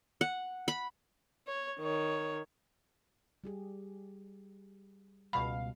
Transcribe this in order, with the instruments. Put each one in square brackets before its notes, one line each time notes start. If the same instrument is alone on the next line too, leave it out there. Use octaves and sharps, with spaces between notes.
[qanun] F#5
B5
[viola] C#5
D#3 C#5
[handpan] G3 G4 G#4
[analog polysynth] C#2 B2 F5 [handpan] G3 [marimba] B5